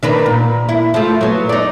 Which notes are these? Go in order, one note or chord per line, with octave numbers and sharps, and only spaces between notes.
D#3 D4 B4
A#2
E4
F3 A3
F#3 B3
D#4 D5